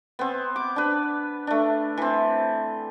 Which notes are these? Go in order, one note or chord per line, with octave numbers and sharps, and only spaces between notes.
B3 C4
D6
D4 B4
A3 D4
E3 C4